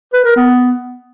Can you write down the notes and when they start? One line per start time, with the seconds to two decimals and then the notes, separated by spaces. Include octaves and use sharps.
0.13 B4
0.25 A#4
0.36 B3